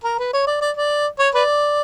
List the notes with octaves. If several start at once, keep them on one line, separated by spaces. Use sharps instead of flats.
A#4
B4
C#5
D5
D5
D5
C#5
B4 D5